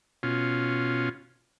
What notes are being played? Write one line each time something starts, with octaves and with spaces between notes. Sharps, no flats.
B2 C#4 F4